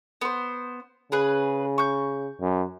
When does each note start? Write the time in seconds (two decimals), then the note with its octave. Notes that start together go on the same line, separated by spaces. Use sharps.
0.21 B3 C5
1.12 C#3 G#4 B4
1.78 C#6 G6
2.41 F#2